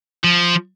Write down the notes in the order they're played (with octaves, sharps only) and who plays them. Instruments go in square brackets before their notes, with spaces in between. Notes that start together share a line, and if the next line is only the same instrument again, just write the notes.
[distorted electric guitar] F3